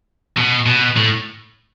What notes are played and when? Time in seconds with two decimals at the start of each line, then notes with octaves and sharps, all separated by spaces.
0.37 B2
0.66 B2
0.97 A2